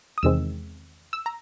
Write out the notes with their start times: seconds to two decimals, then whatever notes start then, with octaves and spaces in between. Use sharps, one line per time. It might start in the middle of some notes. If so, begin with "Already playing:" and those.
0.18 D#6
0.23 E2 C3 D#3 G#3 C4 E6
1.13 E6
1.26 A#5